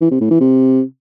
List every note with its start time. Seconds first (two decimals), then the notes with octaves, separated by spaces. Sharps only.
0.01 E3
0.11 C3
0.21 A2
0.31 E3
0.40 C3